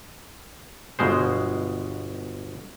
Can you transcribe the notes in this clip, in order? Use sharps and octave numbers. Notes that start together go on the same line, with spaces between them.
G1 B2 G#3 C5